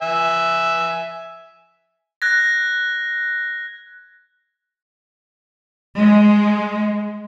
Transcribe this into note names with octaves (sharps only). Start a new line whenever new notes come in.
E5 G#5
F#6 G#6 A#6
G#3